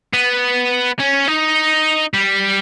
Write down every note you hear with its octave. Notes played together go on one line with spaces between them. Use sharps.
B3
C#4
D#4
G3